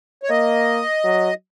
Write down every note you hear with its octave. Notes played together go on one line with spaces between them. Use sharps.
C#5
A#3 D#5
F#3